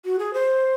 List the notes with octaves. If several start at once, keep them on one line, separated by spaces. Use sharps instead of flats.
F#4
G#4
C5